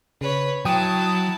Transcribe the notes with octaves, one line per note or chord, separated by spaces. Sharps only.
C#3 B4 C#5
F#3 E4 G5 A5 D#6